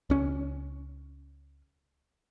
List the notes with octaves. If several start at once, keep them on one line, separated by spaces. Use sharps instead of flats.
C#2 C#4